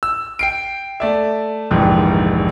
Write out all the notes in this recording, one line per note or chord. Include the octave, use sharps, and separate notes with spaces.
E6
G5 C7 D7
A3 D5 E5
F1 A#1 G#2 D#3 E3